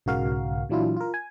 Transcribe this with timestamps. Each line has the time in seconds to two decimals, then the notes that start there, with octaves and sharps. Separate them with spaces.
0.06 B1 G#2 C#3 F#4 A#4 F5
0.69 A#2 E3 F#3 D4 E4 F4
0.97 F4 A#4
1.14 G#5